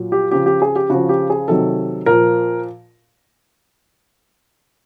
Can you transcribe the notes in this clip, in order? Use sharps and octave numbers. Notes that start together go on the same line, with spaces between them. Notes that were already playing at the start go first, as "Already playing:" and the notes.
Already playing: A#2 F#3
G4
C#3 F3 G4
G4
G#4
G4
C#3 F3 F#4
G4
G#4
C3 D#3 F#3 A4
A#2 F3 A#4